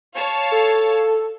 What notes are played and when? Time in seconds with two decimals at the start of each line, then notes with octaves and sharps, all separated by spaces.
0.15 C#5 F5 A5
0.52 A4